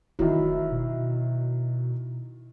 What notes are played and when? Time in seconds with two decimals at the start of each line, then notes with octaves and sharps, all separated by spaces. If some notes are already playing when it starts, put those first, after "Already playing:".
0.19 F1 D#3 F#3 E4
0.72 B2